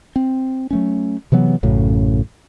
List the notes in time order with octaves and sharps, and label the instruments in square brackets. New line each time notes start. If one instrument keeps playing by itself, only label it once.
[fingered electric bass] C4
F#3 A3 C#4
C3 E3 F#3 B3
A1 F#2 A2 C#3